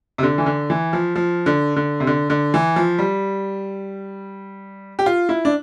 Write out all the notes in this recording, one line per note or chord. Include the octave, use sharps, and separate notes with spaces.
C3
D3
E3
D3
E3
F3
F3
D3
D3
C3
D3
D3
E3
F3
G3
G4
F4
E4
D4